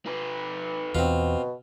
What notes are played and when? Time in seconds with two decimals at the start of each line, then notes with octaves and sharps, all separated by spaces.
0.07 D#4 B4
0.95 E2 B2 C4 F4